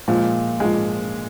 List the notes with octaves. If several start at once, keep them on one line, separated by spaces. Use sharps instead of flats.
A#2 F3 G#3
A#2 F3 G#3